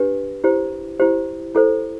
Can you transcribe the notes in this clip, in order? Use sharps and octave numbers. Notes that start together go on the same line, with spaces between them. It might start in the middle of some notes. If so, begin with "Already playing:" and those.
Already playing: D4 G4 B4
E4 G4 C5
E4 G4 C5
E4 A4 C5